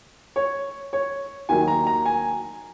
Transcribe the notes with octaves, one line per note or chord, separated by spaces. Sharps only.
C#5
C#5
D#2 D#3 F#3 G#5
A#5
A#5
G#5